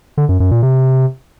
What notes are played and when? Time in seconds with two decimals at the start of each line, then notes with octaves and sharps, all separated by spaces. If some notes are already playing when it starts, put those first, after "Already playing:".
0.17 D3
0.29 F#2
0.40 F#2
0.51 A#2
0.63 C3